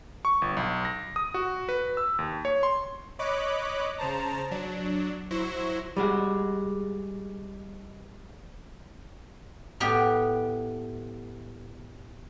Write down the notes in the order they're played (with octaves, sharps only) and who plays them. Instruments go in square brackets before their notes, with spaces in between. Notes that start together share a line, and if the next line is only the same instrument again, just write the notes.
[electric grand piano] C#6
G1
B1
A#6
D#6
F#4
B4
E6
D#2
C#5
C6
[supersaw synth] C#5 D#5 B5 D6 F#6
C#3 C5 A5 A#5
F#3 D4
F#3 E4 C5 C#6 A#6
[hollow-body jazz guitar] G3 G#3 F#4
[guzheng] A2 B3 G4